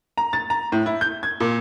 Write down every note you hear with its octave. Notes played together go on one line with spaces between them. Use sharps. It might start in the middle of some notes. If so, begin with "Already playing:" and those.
A#5
A6
A#5
A2
E4
G6
G#6
A#2